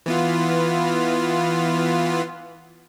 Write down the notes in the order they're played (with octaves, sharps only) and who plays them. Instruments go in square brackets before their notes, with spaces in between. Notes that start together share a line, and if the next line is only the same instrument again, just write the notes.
[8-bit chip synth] E3 B3 F4